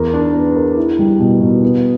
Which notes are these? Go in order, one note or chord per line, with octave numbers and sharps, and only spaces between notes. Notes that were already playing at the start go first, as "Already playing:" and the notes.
Already playing: E2 A#4
D4
B3
A#4
E4
G3
B2
B2
B3